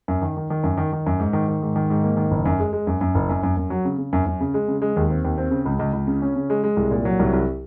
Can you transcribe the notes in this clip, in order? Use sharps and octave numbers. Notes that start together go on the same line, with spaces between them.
F#2
D#3
D#3
D#3
F#2
D#3
D#3
F#2
G#2
D#3
D#3
G#2
D#3
G#2
A#3
D#3
F#1
F#2
G#3
G#3
F#2
F#2
F#1
F#2
F#2
F#2
F#3
C#3
C#3
F#2
F#2
C#3
G#3
C#3
G#3
D#2
C4
D#2
C4
C#3
C#2
C#2
C#2
C#3
C#4
C#3
G#3
G#3
C2
A#2
F#3
C2
C2